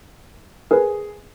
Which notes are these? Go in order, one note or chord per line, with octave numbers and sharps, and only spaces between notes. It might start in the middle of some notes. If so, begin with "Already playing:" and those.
G#4 A#4 B4